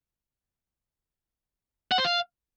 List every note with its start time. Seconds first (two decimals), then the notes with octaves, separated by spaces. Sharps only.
1.92 F#5
1.98 C5
2.05 F5